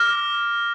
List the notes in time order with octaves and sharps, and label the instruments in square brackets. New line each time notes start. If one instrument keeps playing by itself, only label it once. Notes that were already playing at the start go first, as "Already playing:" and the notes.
Already playing: [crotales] D6 F6 A#6